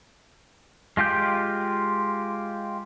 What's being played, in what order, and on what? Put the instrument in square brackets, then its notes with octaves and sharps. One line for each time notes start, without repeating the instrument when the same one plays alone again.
[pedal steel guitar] G#3 F4 G4 G6